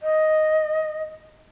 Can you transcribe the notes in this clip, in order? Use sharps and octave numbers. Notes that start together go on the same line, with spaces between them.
D#5